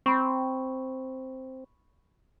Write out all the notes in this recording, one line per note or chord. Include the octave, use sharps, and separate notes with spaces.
C4 B5 C#6